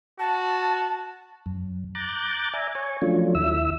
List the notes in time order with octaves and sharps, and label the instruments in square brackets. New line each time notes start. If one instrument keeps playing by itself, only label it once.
[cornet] F#4 [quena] A5
[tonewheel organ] F#2
A#5 D6 F#6 G6 A6
D5 E5 G#5 A#5
C#5 G#5 C#6
F3 F#3 A3 C#4 D4 F4
D#2 E4 E5 E6